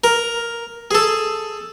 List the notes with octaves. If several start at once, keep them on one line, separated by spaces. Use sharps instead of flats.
A#4
G#4 A4